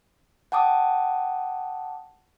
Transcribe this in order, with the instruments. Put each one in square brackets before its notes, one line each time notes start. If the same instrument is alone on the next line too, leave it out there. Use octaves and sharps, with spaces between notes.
[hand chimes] F#5 G5 A5 D6 D#6